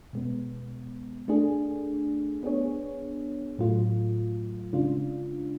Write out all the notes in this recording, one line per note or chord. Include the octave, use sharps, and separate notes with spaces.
B2 G#3 B3
A3 D4 G#4
B3 D4 G#4 C#5
A2 F#3 A3 F4
C#3 G#3 D4 F4